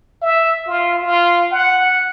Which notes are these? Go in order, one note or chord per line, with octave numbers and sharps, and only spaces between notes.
E5
F4
F4
F#5